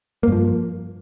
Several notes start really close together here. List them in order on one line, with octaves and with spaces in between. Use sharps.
A#3 G2 F3